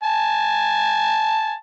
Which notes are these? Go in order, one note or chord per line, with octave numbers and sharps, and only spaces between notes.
G#5 A5